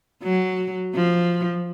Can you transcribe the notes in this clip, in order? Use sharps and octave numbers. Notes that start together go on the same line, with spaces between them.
F#3
F3